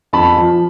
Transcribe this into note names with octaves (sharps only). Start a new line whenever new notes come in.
F2 A5 B5
F3